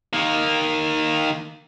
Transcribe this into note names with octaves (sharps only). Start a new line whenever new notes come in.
D#3 A#3